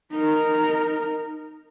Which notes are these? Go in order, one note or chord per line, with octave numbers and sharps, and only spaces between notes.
D#4 A#4